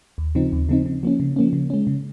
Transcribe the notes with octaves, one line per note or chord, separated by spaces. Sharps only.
D#2
C#3 F3 C4 D#4
D#2
C#3 F3 C4 D#4
C#3
F3 A#3 C#4
C#3
F3 A#3 C#4
C#3
G#3 C#4
C#3